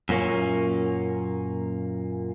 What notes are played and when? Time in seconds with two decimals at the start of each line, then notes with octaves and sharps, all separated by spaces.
0.09 F#2 A#2 A#3 C#4